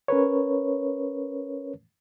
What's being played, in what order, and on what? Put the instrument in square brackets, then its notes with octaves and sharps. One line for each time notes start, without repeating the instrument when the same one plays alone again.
[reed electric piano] C#4 A#4 B4 C#5